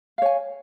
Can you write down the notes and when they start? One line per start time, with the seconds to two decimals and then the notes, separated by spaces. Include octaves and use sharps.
0.18 F5
0.22 C#5
0.26 G#5